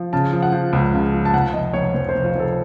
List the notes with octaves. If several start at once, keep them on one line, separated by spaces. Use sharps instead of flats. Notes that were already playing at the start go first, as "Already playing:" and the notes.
Already playing: F3
C#3 A5
F3
F#5
F3
C#2
C#3
F3
A5
F1 F#5
F1 D#5
F1 C#5
F1 C5
C5
F1
F4
F1 A4